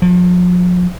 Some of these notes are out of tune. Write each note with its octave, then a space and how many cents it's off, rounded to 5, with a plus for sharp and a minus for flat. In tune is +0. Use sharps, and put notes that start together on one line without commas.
F3 +40